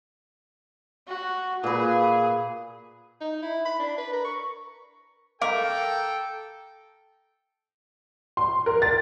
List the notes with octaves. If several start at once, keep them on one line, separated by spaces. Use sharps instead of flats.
F#4
A#2 G#4 B4
D#4
E4
B5
D4
B4
A#4
C#6
A4 A#4 F5 G5 D6
C6
A#4
A6